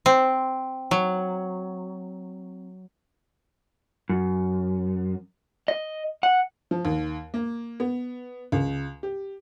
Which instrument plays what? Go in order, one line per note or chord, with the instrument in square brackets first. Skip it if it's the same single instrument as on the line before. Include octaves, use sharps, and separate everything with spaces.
[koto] C4
F#3
[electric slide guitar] F#2
D#5
F#5
[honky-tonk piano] F3
D#2
A#3
B3
C#2
G4